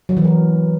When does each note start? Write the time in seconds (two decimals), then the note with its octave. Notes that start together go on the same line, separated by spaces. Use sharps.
0.09 F#3
0.17 E3
0.24 A#4